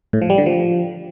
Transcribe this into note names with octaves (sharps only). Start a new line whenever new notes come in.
A2
F3
G3
D3
F3